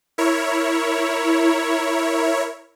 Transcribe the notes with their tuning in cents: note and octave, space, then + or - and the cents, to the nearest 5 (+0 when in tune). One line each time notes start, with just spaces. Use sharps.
E4 +0 A#4 +0 C#5 +0